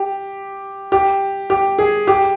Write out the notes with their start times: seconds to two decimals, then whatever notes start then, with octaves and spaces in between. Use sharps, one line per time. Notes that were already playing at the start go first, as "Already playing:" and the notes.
Already playing: G4
0.92 G4
1.50 G4
1.79 G#4
2.07 G4